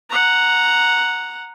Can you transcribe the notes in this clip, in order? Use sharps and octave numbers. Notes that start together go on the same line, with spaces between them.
F#5 A#5